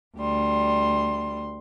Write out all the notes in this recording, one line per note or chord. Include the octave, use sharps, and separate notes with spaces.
D2 G3 C6